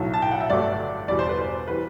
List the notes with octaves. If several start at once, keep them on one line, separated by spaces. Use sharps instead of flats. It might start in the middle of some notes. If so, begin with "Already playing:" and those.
Already playing: B1 A2 F#3 A3
A5
G5
F#5
E5
G1 G2 F#3 A3 D5
E2 B2 G3 D5
C5
B4
C5
E3 G3 B4